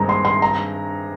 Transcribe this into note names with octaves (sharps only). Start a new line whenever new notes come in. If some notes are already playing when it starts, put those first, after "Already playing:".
Already playing: G2 D#3 G#3 C4 A#5
C6
C6
A#5